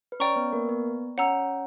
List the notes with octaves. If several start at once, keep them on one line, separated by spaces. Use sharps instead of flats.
B4
C#4 C#5 D5 G5 A#5 C#6
B3 B4
A#3 A#4
B3 B4
C#4 C#5 F#5 A#5 E6